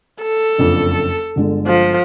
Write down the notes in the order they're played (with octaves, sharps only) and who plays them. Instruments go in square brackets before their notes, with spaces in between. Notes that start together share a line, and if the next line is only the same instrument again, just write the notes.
[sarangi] A4
[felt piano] F#1 F2 D4
G1 D3 G#3
[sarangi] F3